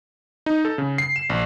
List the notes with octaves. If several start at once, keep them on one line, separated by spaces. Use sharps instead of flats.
D#4
A4
C#3
C7
E7
A#1